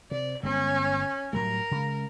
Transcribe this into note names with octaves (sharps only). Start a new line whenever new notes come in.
C3 D5
G1 G#3 B3 C#4
A2 F#3 G3 A#4
C#3 G#3